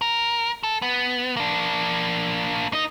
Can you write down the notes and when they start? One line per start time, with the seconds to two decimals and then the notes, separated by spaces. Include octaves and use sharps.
0.01 A#4
0.63 A4
0.82 B3
1.37 A#3 D4
2.73 D#4 D#5